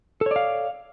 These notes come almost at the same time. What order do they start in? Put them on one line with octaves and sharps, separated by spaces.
A4 C#5 D5 F5